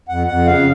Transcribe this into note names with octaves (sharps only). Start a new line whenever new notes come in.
F2 F#5
F2 F#5
C#3 F5